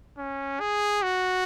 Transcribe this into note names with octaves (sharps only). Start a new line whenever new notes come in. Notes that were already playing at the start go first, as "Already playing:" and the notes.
C#4
G#4
F#4